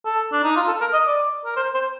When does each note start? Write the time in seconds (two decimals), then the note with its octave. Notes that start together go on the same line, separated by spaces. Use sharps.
0.05 A4
0.32 D4
0.44 D#4
0.56 F4
0.68 A4
0.81 A#4
0.93 D#5
1.07 D5
1.45 A#4
1.56 C5
1.74 C5